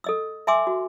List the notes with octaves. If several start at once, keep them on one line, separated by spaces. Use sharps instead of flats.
A4 D#5 E6
E5 G5 G#5 C6 D6 E6
F#4